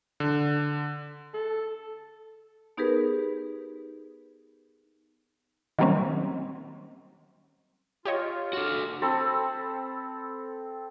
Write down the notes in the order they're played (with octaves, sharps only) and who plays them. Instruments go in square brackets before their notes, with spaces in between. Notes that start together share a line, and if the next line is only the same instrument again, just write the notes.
[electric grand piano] D3
[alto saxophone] A4
[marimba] B3 D#4 G4 G#4 A#4 B4
[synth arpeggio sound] D#3 F#3 G3 A#3 C4 C#4
[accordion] F4 [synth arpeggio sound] G4 C#5 D#5
[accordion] F#2 F6 [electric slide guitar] F#4 A4
[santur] C4 A4 B5